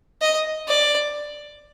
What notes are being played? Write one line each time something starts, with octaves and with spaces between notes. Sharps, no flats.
D#5
D5